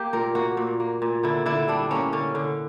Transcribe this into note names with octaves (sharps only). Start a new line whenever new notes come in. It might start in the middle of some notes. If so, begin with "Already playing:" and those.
Already playing: A#3 G4
A#2 A#4
A#3 F#4
A#2
A#3
A#2
D3 E4
D3 E4
G3 D4
A#3 C#4
D3 C#4
D3